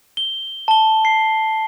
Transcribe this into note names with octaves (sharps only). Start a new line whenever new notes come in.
G7
A5 G7
C7